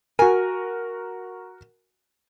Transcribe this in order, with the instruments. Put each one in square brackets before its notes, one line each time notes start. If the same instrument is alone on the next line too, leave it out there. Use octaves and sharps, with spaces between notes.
[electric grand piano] F#4 A#4 [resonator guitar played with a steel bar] G#5